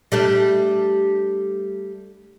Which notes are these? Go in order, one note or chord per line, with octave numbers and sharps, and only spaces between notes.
G3 A3 D4